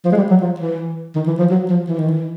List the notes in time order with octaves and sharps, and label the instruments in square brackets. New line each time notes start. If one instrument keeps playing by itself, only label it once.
[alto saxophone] F3
G#3
G3
F#3
F3
E3
D#3
E3
F3
F#3
F3
E3
D#3
E3